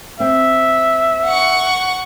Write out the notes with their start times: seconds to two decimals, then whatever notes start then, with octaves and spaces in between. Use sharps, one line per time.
0.20 C4 E5
1.25 F#5 C#6